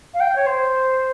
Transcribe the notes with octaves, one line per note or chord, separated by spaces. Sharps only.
F5
G5
C#5
C5